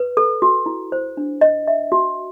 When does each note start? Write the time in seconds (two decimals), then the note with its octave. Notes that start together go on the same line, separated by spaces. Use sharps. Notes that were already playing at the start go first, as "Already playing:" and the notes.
Already playing: B4
0.17 A4
0.42 F#4
0.66 E4
0.92 C5
1.17 D4
1.41 D#5
1.67 E5
1.92 F#4